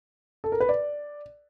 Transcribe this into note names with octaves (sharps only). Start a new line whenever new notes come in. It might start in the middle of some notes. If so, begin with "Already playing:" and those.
A4
A#4
B4
D5